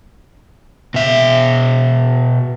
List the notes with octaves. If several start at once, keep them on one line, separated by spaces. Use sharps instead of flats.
B2 E5